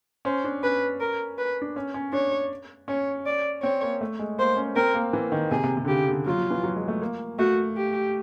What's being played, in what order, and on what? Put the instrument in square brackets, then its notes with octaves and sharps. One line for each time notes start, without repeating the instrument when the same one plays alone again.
[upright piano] C#4 [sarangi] C5
[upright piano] D4
[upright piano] C#4 [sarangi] B4
[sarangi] A#4
B4
[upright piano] D4
C#4
C#4
[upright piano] D4 [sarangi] C#5
[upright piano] C#4 [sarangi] C#5
[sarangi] D5
[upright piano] C4 [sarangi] C#5
[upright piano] A#3
A3
G#3
[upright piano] A#3 [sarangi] C5
[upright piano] C#4
[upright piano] C4 [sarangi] A#4
[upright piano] A#3
E3
D#3
[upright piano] C3 [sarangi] G#4
[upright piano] C3
C3
D3
[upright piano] C#3 [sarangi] G4
[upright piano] D3
[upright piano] F#3 [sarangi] F4
[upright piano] F3
E3
F#3
G#3
A3
A#3
[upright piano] A3 [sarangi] F#4
[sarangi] G4